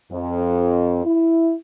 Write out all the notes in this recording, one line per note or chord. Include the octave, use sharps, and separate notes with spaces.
F2
E4